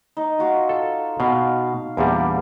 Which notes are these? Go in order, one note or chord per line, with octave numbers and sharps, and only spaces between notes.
D#4
F4 F#4 F5
A4
B2 F5
E2 A#2 G3 B3 D4 G#4